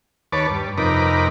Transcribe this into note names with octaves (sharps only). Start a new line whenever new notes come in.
D#2 B4 C#5 A5 D6
G2
F2 C3 D#4 A#4 B4 D6